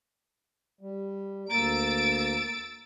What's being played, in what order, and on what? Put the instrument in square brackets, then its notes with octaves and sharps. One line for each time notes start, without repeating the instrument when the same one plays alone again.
[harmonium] G3
[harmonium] D2 A#3 A#5 [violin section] E6 A6 D7